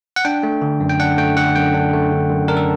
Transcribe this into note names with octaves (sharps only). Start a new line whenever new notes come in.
F#5
D4 G5
A3
D3
F#2
G5
D4 F#5
A3 G5
D3 F#5
F#2 G5
D4
A3
D3
F#2
D4 A#4
A4